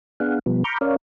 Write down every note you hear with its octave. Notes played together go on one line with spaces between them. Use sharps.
B3 D4 G#4 F5 F#5
B2 F3 G3 B3
A#5 B5 C#6 D6 F6 G6
C#4 A#4 C#5 D5 F5